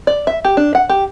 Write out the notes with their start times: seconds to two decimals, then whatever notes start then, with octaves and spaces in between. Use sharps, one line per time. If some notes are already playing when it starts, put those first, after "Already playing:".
0.07 D5
0.27 E5
0.44 G4
0.57 D4
0.75 F#5
0.89 G4